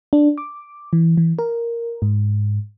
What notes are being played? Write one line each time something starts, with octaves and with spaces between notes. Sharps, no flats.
D4
D6
E3
E3
A#4
G#2